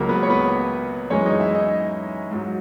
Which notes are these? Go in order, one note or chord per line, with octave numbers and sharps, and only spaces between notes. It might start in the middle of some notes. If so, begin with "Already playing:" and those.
Already playing: C#2 C#3 F#3 A#3 A#4
B3 B4
C#5
B3 B4
F#2 E3 G#3 C#4 C#5
D#4 D#5
E4 E5
D#4 D#5
G#2 F#3